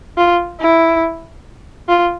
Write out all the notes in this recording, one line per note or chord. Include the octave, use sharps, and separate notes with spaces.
F4
E4
F4